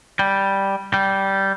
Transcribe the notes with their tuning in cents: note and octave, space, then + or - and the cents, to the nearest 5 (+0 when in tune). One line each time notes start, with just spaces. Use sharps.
G3 +0
G3 -10